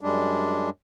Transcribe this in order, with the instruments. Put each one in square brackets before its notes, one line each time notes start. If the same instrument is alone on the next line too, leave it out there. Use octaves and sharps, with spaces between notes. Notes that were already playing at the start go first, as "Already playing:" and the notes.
[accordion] F#2 G3 G#3 D4